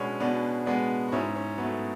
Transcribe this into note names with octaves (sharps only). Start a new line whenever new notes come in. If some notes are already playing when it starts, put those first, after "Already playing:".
Already playing: B2 G#3 B3 C#4 D4
B2 B3 D4
G#3 B3 D4
F#4
G#2 C#4 E4
C#4
F#3 A3 B3